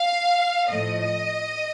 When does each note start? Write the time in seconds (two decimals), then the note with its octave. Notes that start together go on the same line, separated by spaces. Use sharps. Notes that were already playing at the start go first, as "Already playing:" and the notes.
Already playing: F5
0.70 A2 F3 A3 D#5